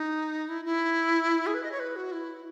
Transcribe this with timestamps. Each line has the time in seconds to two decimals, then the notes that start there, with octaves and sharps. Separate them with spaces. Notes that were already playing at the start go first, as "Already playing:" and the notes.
Already playing: D#4
0.48 E4
0.65 E4
1.47 G#4
1.54 B4
1.63 D#5
1.72 C#5
1.80 B4
1.96 F#4
2.12 E4